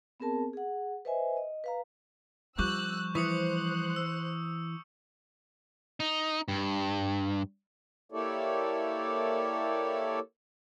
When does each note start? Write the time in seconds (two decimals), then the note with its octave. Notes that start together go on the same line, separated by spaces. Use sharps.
0.20 B3 C4 G#4 A#4 A5
0.53 G#4 F#5
1.05 B4 C5 D#5 E5 G#5
1.37 D#5
1.64 B4 F5 A#5
2.58 F3 G3 C#6 D6 E6 F#6 G6
3.15 E3 C5 C#6 D#6 F#6 C#7
3.96 E6
6.00 D#4
6.48 G2
8.12 A#3 E4 G4 A4 C#5 D5